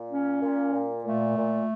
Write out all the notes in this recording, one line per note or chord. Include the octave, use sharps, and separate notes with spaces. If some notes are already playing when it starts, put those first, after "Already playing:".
Already playing: A#2
C#4
A#2
A#2
A#2 A3
A#2